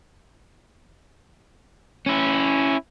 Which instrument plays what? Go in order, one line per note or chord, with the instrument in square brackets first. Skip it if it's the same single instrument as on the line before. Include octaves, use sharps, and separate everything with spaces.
[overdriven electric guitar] C#4 E4